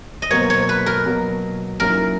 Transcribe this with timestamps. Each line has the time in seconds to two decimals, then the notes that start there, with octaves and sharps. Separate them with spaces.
0.22 D#5
0.31 B2 F#3 A#3 C#5
0.50 C#5
0.69 B4
0.86 A#4
1.06 B2 F#3 A#3
1.80 G#2 F#3 A#3 C#4 E4 A#4